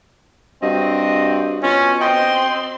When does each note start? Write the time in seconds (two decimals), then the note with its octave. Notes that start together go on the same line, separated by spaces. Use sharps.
0.63 G2 C4 F#4 D#5
1.63 B2 C#4 F4
2.01 C4 D#5 G5 C6